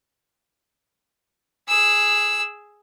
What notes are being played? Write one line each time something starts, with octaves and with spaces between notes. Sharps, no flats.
G#4 E6